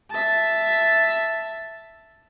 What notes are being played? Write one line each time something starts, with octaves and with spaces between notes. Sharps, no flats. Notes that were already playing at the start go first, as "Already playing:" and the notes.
E5 A5